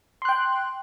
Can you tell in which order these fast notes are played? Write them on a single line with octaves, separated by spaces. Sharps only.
C6 F#6 G5